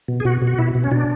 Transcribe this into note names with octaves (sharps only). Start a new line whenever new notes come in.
B2
G#4
B2 F#4
B2
F#4
B2 E4
B2
C#4
B2 D4